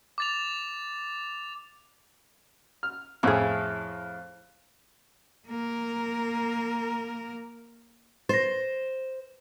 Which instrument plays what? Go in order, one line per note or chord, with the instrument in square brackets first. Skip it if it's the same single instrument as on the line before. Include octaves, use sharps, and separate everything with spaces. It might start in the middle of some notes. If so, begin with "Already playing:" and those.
[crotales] D6 A6 F7
[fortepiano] F6
[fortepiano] F2 A2 F6 [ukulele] E4 G#4
[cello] A#3 A#4
[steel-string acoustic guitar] C5 [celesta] A6 A#6